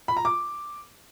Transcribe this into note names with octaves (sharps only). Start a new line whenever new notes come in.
B5
A#5
D6